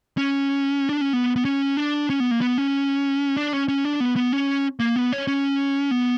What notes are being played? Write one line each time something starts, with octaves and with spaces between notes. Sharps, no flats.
C#4
D4
C#4
B3
B3
C#4
D4
C#4
B3
A#3
B3
C#4
D4
C#4
C#4
D4
B3
B3
C#4
A#3
B3
C#4
C#4
B3